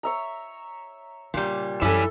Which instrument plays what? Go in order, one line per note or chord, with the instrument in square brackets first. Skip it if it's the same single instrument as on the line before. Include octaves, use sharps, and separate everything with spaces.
[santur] C#5 E5 A#5
[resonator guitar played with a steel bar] A#2 G3 [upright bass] C#3
[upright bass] F#2 [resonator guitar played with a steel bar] G3 C#4 [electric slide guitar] E4 G#5 [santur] A4 E5